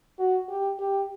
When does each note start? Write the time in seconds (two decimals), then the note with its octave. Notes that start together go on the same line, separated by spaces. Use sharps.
0.19 F#4
0.49 G4
0.79 G4